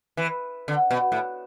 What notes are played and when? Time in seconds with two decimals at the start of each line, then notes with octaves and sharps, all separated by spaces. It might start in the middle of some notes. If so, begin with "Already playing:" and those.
0.17 E3
0.68 D3
0.91 B2
1.12 A2